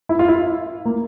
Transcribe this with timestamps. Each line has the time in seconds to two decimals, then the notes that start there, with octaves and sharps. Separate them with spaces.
0.09 E4
0.19 F4
0.28 E4
0.85 A#3